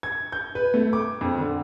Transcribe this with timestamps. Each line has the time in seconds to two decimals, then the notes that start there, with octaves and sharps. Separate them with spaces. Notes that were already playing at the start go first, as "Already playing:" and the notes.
0.03 G#6
0.32 G6
0.55 B4
0.74 A3
0.93 D6
1.21 F2
1.38 D3